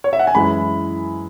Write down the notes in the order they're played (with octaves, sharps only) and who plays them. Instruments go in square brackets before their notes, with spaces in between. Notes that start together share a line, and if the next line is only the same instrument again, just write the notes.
[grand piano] C#5
E5
F#5
G#5
F#2 E3 G#3 E4 B5